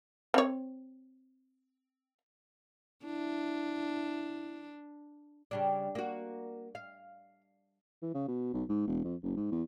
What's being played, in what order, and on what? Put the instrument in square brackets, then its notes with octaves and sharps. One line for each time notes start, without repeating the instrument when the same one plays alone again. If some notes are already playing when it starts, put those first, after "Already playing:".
[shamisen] C4 C#5
[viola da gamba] D4 [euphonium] E4
[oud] C#3 G3 D4
A#3 F#4
F5
[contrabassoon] E3
C#3
B2
B1
G#2
E1
F2
F#1
G#2
E2